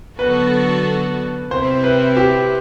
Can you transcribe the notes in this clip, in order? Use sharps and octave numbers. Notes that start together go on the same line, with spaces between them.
D3 F#3 B3 F#4 A4 B4
C3 G3 C4 E4 C5
B4
G4